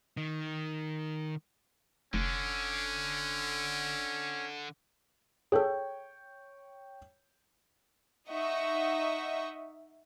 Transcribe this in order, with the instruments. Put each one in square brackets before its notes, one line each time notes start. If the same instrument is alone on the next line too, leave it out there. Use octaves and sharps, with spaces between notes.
[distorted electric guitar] D#3
[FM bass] F1 [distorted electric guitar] D3 [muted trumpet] C#4
[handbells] G#4 A4 [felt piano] C#5 G5
[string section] D#4 D#5 E5 F#5 C#6